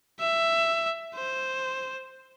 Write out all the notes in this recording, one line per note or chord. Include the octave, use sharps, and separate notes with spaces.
E5
C5